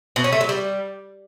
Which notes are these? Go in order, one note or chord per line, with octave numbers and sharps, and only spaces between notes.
B2
C#4
A3
F#3
G3